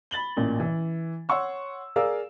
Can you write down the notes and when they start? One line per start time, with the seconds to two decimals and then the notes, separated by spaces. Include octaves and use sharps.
0.11 B5 A6 F#7 G7
0.37 A1 A#2
0.60 E3
1.29 C#5 F#5 C6 C#6 E6
1.96 G#4 A#4 D5 F5 E6